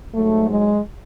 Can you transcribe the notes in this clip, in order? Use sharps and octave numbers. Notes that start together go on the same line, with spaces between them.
G#2 F#3 A3
G#3